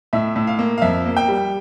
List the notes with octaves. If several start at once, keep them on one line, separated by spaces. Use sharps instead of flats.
A2 E5
A2
F5
A#3
F5
F2 E5
A#3
G5
G3